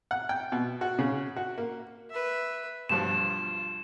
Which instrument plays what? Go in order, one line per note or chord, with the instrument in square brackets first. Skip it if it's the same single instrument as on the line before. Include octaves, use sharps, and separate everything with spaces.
[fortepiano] F#5
G5
B2
F#4
C#3
F#4
A#3
[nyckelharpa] B4 E5
[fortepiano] B1 G2 F3 [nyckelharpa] F4 [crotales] E7